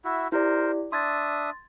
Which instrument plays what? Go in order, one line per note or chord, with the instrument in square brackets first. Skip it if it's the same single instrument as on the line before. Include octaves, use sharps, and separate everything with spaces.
[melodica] E4 F#4 E5
[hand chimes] E4 G4 D5 [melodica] A#4 C5
[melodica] D4 E5 D#6 [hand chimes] C6 G#6 A6